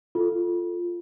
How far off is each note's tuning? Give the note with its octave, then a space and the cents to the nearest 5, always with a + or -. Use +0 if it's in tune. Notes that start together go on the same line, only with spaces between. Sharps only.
F4 +0 A4 +0